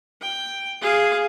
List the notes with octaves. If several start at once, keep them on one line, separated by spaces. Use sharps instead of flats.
G5
G#4 F5